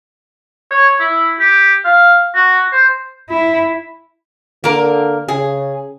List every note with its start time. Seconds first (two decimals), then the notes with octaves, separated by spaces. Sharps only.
0.71 C#5
1.00 E4
1.40 G4
1.85 F5
2.35 F#4
2.73 C5
3.30 E4
4.64 D3 A#3 A#4
5.28 C#3 G#4